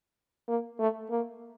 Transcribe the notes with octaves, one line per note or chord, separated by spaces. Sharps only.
A#3
A3
A#3